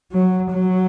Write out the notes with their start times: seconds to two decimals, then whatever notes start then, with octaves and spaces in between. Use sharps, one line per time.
0.13 F#3
0.52 F#3